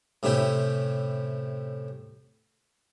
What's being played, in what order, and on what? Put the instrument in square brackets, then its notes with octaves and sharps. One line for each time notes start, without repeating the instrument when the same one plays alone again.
[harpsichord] A2 C3 C#4 E4 G4